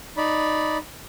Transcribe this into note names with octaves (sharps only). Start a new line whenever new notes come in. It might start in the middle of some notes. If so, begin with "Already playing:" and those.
D#4 D5 B5